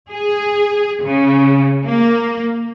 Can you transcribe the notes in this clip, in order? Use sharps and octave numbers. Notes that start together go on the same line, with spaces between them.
G#4
C#3
A#3